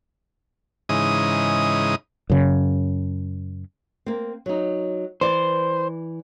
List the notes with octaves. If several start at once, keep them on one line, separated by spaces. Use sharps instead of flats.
G#2 C#3 E3 D#4 D#6
F#2 C#3
A#3 C4
F#3 D#4
E3 C5 D5